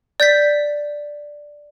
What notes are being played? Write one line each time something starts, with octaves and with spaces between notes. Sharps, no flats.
D5 G6 A6 B6